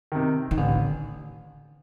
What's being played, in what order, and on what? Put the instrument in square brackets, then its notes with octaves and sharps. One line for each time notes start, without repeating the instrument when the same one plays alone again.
[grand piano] C3 D#3
[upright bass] D#3
[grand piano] A1 [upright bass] D3